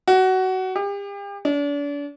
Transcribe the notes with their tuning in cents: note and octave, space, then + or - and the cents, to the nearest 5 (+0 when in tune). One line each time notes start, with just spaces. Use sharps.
F#4 +20
G4 +40
D4 -40